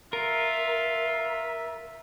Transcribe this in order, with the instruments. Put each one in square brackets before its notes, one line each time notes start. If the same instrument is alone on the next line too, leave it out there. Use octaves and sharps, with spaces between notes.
[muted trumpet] F4 [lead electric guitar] A#4 [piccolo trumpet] E5